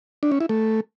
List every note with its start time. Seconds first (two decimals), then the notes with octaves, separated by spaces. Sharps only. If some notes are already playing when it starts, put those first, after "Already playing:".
0.23 D4
0.32 C#4
0.40 E4
0.49 A3